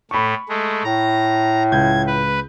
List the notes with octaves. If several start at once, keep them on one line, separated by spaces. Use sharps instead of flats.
A2 A3 B5 C#6
G#3 A3
A2 A#5
C#2 G6 G#6
B4